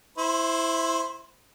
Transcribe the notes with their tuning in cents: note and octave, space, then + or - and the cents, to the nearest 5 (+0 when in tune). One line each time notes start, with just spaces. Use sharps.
E4 +0 C5 +0 C6 +30